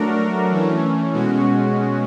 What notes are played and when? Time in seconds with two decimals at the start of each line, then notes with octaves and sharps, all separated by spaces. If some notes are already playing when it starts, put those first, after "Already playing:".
Already playing: F#3 A3 D4 F#4 A#4
0.50 E3 A3 C#4
1.13 B2 G#3 C#4 F#4